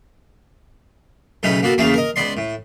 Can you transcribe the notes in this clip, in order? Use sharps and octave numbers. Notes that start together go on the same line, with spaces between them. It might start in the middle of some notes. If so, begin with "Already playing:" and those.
B1 A2 C#3 C#4 D#4 B4
A#3 B3 F#4 A4
E2 C#3 A3 A#3 G#4 F5
A#4 D#5
C#2 B3 D5 C6
A2